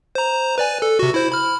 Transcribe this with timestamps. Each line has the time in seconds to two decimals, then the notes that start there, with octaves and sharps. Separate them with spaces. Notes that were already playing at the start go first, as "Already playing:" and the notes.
0.15 C5 A#5
0.58 B4 D5 G#5
0.82 A4
0.99 C3 F#4
1.14 E4 C5
1.32 B5 F6